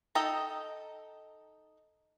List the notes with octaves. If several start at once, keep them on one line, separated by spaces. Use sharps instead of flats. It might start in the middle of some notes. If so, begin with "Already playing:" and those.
D#4 A4 D#5 G5 A#5